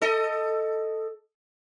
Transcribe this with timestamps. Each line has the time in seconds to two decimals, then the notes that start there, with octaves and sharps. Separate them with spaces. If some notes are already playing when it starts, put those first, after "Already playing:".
0.02 A4 D#5